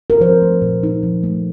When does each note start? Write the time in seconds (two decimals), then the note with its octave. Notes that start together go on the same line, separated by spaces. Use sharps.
0.10 A#4
0.21 F3 C5
0.42 A3
0.62 A#2
0.83 D#4
1.03 F3
1.23 A3